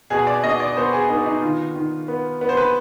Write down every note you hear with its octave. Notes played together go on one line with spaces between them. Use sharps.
B2 G#4
D5
B2 D#5
D5
B3 C5
G#4
B3 D#4
D#4
D#3 F4
D#3
B3
B3
C5
B4